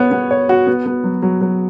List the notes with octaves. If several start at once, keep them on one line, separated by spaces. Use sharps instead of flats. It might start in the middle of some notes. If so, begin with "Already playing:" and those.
Already playing: B3 C#5
B3
C#5
F#4
B3
B3
F#3
F#3
F#3